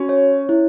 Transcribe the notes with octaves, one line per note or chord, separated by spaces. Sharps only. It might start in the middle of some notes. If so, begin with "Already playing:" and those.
Already playing: C#4 F#4
C#5
E4